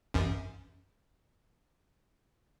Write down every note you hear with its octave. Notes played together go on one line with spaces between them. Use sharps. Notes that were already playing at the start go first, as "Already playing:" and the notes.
A1 F#2